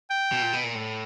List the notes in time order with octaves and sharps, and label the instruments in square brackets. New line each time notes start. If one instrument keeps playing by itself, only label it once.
[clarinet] G5
[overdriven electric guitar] B2
A#2
B2
A#2
A2